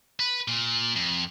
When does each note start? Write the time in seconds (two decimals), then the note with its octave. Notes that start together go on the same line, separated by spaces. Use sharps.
0.20 B4
0.48 A#2
0.96 F2